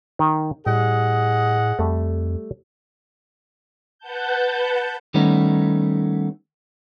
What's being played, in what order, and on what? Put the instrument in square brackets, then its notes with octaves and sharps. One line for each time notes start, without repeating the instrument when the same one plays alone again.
[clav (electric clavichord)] D#3
[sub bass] A2 [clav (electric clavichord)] G3 [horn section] G#4 D#5 F#5
[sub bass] F2 [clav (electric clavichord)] G3 A3
[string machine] B4 F#5 A5 G6
[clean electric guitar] D#3 G3 A3 B3 C#4 D#4